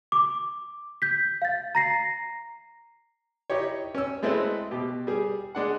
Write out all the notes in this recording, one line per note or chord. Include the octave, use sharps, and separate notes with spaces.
D6
G6 B6
F5 A6
A#5 A#6 C7
D#4 E4 G4 C#5
C#4 E6
G#3 A3 C4 E4 B4 D#5
B2 G4
G3 G#4
G#3 D4 F#5